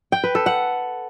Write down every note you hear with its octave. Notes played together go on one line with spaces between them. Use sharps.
G5
B4
A4
F#5